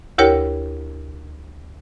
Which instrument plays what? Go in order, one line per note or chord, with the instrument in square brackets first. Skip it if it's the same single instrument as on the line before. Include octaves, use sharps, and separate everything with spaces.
[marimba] D2 E4 G4 A#4 C#5 G5